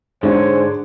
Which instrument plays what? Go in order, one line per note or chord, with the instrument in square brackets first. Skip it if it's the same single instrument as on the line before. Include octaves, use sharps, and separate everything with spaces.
[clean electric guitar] G#2 D3 [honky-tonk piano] G#3 D4 [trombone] C5 [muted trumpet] C#5